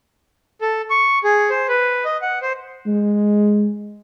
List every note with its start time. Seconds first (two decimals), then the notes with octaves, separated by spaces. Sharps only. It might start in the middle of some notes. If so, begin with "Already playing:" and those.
0.61 A4
0.90 C#6
1.24 G#4
1.50 C5
1.69 B4
2.05 D#5
2.22 F#5
2.42 C5
2.87 G#3